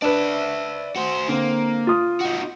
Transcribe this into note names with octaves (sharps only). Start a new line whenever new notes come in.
D4 B4 D5 E5
F#4 C5
D3 A#3 C4
F4 D#6
D#4 F#4